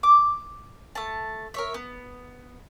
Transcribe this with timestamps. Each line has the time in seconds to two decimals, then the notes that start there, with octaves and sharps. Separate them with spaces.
0.03 D6
0.95 A3 A5
1.54 A#4 C#5 E5
1.74 B3